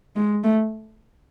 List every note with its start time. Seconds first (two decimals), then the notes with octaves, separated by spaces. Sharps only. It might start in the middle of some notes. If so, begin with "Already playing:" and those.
0.16 G#3
0.44 A3